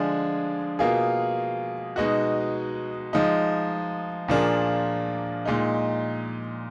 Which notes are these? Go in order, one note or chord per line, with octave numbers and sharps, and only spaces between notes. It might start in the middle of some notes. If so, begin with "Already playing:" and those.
Already playing: D3 F3 G#3 D4 G#4
B2 A#3 F4 G#4
B2 G#3 D#4 F#4
F3 G#3 D#4
A#2 F3 A#3 D4 G#4
A#2 G#3 D#4